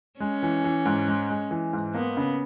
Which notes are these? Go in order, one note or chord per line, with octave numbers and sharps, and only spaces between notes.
G#3 C#4
E3
E3
G#2
G#3
G#3
E3
G#2
A#3 B3
C#3